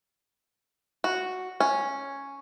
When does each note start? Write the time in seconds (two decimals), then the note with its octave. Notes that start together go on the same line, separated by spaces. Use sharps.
1.04 F#4
1.60 C#4